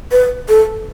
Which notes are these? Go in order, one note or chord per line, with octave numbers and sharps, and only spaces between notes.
B4
A4